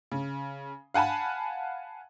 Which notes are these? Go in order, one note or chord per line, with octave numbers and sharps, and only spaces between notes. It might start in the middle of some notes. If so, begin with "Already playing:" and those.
C#3
F5 F#5 G#5 A5 B5